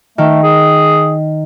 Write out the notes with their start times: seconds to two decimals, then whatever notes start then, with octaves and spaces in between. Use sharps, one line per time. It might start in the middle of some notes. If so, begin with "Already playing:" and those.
0.18 D#3 A3
0.43 G#4